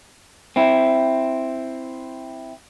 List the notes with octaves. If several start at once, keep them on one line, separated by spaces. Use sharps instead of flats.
C4 E4